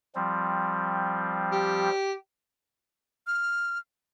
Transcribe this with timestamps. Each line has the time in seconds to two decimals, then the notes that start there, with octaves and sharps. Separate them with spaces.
0.15 F3 G3 C4
1.52 G4
3.27 F6